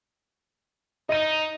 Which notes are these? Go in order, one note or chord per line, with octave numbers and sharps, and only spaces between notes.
D#4 D#5 D#7